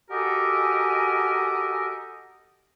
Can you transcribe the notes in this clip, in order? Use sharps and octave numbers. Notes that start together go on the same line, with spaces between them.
F#4 G4 A4 A#4 D#5 G#5